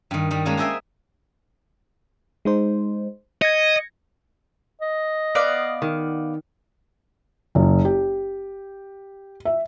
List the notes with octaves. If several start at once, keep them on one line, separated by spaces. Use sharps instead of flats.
G2 D#3
D#3 G3
G#3 A#3 C#4 D4 F5 G#5
G#4 C5 D#5 E5 G5 G#5
G#3 D#4 C5
D#5 G#6 A#6 C#7
D#5
B3 D5 F5
D#3
F#1
G4
E5